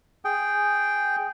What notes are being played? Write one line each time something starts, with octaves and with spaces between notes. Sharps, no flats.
G#4 G5